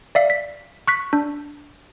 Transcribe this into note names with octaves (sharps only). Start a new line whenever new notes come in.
D5 E5 F5
B6
C#6 F#6 B6
D4